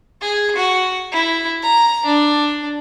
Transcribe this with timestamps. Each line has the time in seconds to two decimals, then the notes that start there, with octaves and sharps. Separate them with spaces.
0.21 G#4
0.56 F#4
1.12 E4
1.62 A#5
2.05 D4